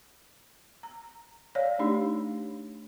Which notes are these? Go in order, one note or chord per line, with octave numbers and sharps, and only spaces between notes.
A#5
C#5 D5 F5
A3 D4 D#4 G4